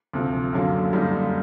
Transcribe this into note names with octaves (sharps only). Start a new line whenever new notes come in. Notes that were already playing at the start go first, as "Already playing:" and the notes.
D2 C3 F3
F#2 D3 F#3 A#3
F#2 D3 G3 A#3 D#4